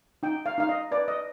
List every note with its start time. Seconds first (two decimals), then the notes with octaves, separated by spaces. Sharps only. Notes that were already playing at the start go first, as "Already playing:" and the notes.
0.23 D#4 G5
0.46 F5
0.58 D#4 F5
0.69 D#5
0.91 B4 D5
1.08 D#5